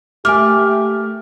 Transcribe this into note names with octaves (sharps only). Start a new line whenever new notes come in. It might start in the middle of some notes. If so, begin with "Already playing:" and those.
A3 A#3 G4 G#5 D6 F6